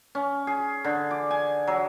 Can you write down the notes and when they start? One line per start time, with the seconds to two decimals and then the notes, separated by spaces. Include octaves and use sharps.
0.15 C#4
0.47 G#4
0.84 D3
1.11 D6
1.30 G#5
1.67 F#3